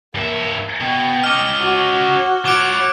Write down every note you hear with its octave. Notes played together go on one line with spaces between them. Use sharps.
G2 A#3 E5
B2 G5
C#4 D#5 D6 F6
F#4
F4 C#5 D6 F#6 D7